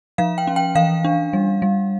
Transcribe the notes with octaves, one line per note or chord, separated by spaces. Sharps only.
F3 F5
G5
C#4
G5
E3 F5
D4
G3
G3